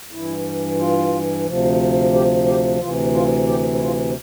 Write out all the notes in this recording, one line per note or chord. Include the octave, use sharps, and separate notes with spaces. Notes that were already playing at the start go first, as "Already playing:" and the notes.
G2 E3 E4
F4
D2 C3 F3
G4
G4
D2 C3 E3 F4
F4
G4
E4
F4